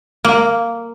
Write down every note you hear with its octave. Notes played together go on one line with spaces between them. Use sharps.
A#3